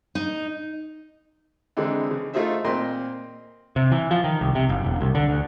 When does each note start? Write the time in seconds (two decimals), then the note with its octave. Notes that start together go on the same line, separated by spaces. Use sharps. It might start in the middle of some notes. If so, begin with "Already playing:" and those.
0.15 D#4
1.77 D3 E3 G#3 C4 D#4
2.11 C#3
2.34 A3 D#4 F4 G#4 C5 E5
2.64 A#2 A#3 C4 D#5 C6
3.76 C3
3.91 E3
4.11 F3
4.24 D#3
4.41 C2
4.55 C3
4.69 F#1
4.84 E1
5.01 C2
5.15 D3
5.29 D2